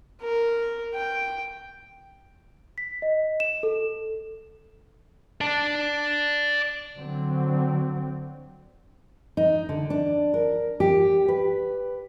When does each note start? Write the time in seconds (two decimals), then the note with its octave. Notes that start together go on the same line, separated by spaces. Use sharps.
0.22 A#4
0.95 G5
2.78 B6
3.02 D#5
3.40 E7
3.63 A4
5.41 D5 A5
6.94 D3 F#3 C4
9.37 D#4
9.69 D3
9.90 D4
10.34 A#4
10.80 G4
11.28 B4